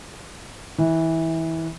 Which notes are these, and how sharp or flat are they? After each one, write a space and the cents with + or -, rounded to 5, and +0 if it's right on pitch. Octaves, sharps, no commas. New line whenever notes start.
E3 -20